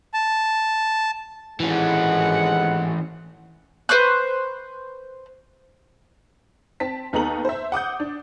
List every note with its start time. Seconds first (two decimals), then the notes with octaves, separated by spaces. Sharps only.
0.14 A5
1.60 G#1 E3 G#3 C#4 F#5
3.89 B4 C5 C#6 F#6
6.80 C4 A5 B6
7.13 D#2 B3 D#4 A4 A#5 F#7
7.45 C5 E5
7.72 F#5 D6 D#6 G6
8.00 D4